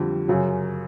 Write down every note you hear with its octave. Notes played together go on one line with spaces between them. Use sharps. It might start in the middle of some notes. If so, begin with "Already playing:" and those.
Already playing: F2 D3 G3
F#2 C#3 F#3